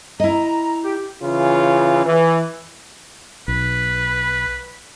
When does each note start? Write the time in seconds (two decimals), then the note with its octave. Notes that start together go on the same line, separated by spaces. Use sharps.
0.20 E4 D#5 A#5
0.83 G4
1.23 C#3 E3 F4
2.06 E3
3.48 B1 B4